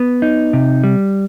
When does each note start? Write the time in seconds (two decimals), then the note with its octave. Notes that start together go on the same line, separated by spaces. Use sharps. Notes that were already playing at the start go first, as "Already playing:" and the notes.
Already playing: B3
0.22 D#4
0.53 C3
0.84 G3